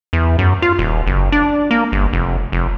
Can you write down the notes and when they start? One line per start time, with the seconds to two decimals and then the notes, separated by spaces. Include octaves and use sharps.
0.13 E2
0.39 F#2
0.62 F4
0.79 D#1
1.07 F#1
1.32 D4
1.71 A#3
1.92 G1
2.13 F1
2.52 F1